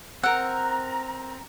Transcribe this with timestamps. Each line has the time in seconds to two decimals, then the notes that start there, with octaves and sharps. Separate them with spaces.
0.23 C4 A#4 F#5 A#5 E6